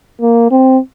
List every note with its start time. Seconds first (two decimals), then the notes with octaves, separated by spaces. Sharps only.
0.21 A#3
0.51 C4